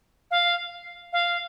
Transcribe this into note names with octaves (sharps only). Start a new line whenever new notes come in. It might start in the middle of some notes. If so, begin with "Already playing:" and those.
F5
F5